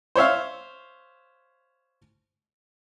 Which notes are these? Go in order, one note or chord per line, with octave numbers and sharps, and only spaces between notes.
C5 C#5 E5 F5